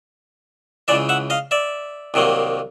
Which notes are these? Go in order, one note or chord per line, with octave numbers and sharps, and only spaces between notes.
C#2 C#3 E3 D5 E5
E5 F#5
D#5 F5
D5 E5
C2 C3 D#3 F#3 A#3